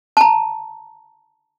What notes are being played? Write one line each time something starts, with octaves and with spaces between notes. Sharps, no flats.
A5 A#5